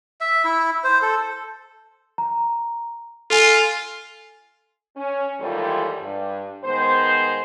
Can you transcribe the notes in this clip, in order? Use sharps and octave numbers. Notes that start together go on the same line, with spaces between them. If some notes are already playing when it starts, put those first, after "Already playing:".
E5
E4
C5
A4
A#5
F4 A4 G#5 D#7
C#4
D#2 G#2 E3 G3 F4 A4
G2
D#3 G#3 B3 C5